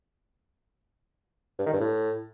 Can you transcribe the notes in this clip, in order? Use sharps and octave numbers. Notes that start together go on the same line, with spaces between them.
G2
D#3
G2
A2